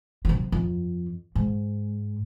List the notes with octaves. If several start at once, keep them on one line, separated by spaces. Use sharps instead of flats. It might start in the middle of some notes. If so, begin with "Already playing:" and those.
C3 F#3
F2
G#2